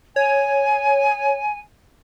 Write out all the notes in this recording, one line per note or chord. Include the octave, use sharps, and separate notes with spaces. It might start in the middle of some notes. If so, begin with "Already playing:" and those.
C#5 G#5